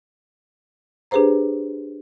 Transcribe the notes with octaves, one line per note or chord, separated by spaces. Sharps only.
D4 G4 G#4 B4 C5 A#5